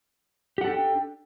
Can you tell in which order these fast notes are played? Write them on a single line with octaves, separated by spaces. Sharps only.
G4 F#5 A4 D4 G5